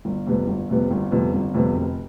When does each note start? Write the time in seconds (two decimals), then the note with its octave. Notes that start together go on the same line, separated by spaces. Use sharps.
0.05 G1
0.27 F2 C3 G3 B3
0.47 G1
0.69 F2 C3 G3 B3
0.91 G1
1.11 F2 C3 G3 B3
1.33 G1
1.54 F2 C3 G3 B3
1.75 F1